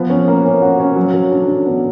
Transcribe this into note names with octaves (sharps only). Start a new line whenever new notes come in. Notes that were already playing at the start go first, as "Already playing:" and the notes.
Already playing: F3 B3
C#4
A#3
C#4
F#4
C#4
F#3
F#3
D4
D4
B3